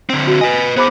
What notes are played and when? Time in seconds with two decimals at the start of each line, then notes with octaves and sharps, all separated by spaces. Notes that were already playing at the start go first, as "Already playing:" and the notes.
0.10 D3 C4
0.27 F#4
0.41 B4 D#5 G#5
0.77 B3 G#4 C5 B5 D6